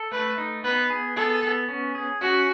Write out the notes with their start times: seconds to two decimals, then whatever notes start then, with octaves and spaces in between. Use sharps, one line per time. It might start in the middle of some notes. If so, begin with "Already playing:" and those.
Already playing: A4
0.12 A3 B4
0.38 D#4
0.64 B3 B4
0.90 G#4
1.16 B3 A4
1.43 B3
1.68 C#4
1.95 G#4
2.21 C#4 F#4